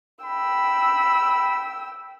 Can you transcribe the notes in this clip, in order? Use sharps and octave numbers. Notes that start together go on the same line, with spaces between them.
G5 B5 E6